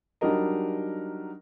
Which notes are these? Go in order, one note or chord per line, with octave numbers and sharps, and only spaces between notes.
F#3 G3 D4 D#4 A#4 D#5